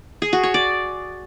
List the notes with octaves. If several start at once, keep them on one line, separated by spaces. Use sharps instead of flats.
G#4
F#4
C#5
D5